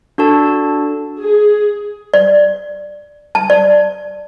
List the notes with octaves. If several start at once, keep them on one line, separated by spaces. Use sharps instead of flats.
D4 F#4 A4 A5
G#4
D5
A5
D5